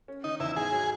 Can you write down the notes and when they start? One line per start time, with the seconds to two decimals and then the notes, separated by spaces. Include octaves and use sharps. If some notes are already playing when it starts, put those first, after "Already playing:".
0.08 C#4
0.24 D#3 D#4
0.40 E2 E4
0.56 G#2 G#4
0.72 F#3